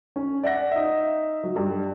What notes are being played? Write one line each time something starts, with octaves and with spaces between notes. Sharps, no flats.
C#4
D5 E5 F#5 A#6
D#4 E5
F#3
G2 G3